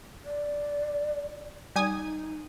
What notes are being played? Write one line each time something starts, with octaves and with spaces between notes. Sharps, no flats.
D5
G3 D#4 G#5 D#6